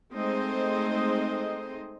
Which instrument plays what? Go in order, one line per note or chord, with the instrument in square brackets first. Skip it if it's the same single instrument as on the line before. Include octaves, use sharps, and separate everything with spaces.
[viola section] G#3 A3 C4 D#4 C5 D#5